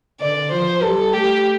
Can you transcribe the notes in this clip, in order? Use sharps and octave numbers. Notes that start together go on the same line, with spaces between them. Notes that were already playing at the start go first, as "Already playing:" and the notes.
D3 D5
F3 C5
G3 A4
A3 G4